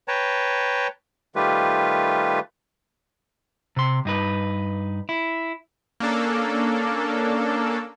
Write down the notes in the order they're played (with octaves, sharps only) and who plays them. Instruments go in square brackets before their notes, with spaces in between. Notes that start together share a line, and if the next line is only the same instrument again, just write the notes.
[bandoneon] B4 C#5 G5 A5 A#5
D#3 G3 A3 F4 G4 B4
[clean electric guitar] C3 C6
G2 D#4 B4
E4
[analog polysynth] A#3 C#4 D4 A4